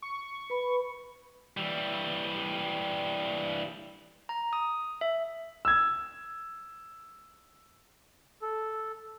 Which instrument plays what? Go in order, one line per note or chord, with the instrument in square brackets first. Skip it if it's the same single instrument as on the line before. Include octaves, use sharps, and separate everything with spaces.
[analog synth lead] C#6
[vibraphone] B4 B5
[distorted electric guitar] E3 G3
[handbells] A#5
D#6
E5
[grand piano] E6 G#6
[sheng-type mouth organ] A4